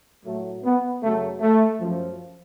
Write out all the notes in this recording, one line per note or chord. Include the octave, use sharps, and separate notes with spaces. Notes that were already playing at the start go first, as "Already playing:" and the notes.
A2 F#3 A3
B3
F#2 C#3 F#3 A3
A3
F#2 F3